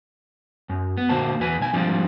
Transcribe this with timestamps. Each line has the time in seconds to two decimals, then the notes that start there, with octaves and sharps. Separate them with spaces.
0.69 F#2
0.97 B3
1.09 A#2 D3 A#3 F#4 C5 A5
1.40 E2 E3 B4 G#5
1.60 B1 G#5
1.73 G#2 F3 G3 C4 D4 F4